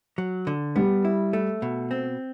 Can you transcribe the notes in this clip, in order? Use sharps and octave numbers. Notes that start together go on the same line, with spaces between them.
F#3
D3
G3 B3
E4
A3
B2
C4